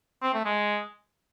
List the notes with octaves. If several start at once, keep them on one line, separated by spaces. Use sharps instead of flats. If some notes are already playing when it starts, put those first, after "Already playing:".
C4
A3
G#3